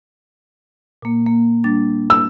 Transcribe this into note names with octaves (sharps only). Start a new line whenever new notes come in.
A#2 A#3
A#3
G3 D4 A6
E6